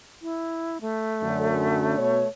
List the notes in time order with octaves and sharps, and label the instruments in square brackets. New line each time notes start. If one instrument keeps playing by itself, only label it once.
[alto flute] E4
A3
[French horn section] F#2 D3
B2 C#5